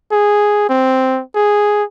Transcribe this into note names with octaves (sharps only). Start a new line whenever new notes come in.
G#4
C4
G#4